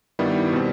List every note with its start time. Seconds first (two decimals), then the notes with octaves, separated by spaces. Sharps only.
0.19 G2 D#3 G3 B3 E4
0.53 B2 G3 C4